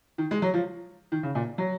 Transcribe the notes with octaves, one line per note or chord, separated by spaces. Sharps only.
D#3
G#3
F#3
F3
D#3
C#3
A#2
F#3